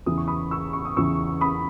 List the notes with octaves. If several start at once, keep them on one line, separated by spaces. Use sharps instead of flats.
E2 C#3 E3 D#6
C#6
B5 D#6
C#6 E6
C#6
D#6
E2 C#3 E3 C#6 E6
B5 D#6